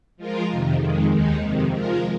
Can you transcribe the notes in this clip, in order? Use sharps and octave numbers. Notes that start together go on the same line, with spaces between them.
F3 G#3 F4 A#4
F2 C3 D#3
F2 D#3 G#3
D#2 D#3 G#3 D#4
F2 C3 D#3
F3 G#3 F4 A#4